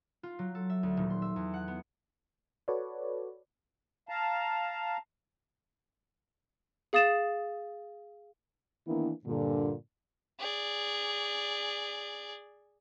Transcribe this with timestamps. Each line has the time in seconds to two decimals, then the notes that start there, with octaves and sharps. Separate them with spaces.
0.23 F4
0.39 F#3
0.55 A4
0.70 E5
0.83 D2
0.97 D#1
1.10 C6
1.22 E5
1.36 E2
1.54 F#5
1.68 B3
2.68 F#4 A4 B4 C#5 D5
4.09 F5 A5 A#5
6.93 G#4 F5 D#6 A6 E7
8.87 D#3 E3 A#3 B3 D4 E4
9.25 G2 A#2 D3
10.39 G#4 D5